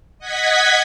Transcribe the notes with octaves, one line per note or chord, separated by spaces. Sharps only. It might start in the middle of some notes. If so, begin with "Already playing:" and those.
D#5 F#5 G#6 B6